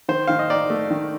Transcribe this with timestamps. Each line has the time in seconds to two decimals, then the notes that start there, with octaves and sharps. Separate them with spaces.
0.09 D#3 C5
0.27 D#3 F5
0.39 D#5
0.50 D#4 D5
0.70 A3
0.91 D#3